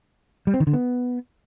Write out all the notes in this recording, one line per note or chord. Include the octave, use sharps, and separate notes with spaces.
G3
C4
D#3
D3
B3